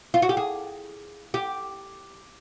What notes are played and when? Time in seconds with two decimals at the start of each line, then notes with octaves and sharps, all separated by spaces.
0.14 F4
0.22 F#4
0.29 G4
0.37 G#4
1.34 G4